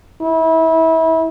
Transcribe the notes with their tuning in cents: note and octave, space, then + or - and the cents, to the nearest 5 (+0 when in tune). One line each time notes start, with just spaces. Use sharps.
E4 -30